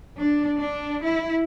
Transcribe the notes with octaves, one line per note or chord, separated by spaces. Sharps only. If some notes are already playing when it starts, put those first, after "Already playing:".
D4
D4
E4